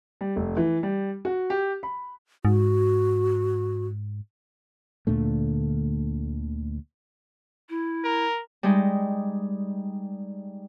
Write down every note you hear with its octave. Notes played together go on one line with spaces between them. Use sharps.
G3
F1
E3
G3
F#4
G4
B5
G#2 F#4
D2 A#2 D3 A3
E4
A#4
G3 G#3 D#4